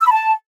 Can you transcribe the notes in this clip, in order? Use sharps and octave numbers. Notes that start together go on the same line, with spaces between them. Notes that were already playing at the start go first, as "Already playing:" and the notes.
E6
B5
A5